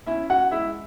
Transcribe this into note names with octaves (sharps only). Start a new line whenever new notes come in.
C#4 E4 E5
F#4 F#5
G#3 E4 E5